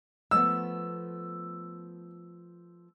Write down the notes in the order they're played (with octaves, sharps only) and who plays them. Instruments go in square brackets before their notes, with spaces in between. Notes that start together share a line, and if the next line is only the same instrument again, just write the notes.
[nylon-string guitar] F3 A3 B3 [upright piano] E6